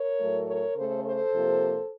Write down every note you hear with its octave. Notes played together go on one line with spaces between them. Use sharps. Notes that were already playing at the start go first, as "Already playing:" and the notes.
Already playing: A#4 C#5
A2 F#3 A3
A#4 C#5
C#3 A3 A4 C5
A4 C5
C3 F3 A#3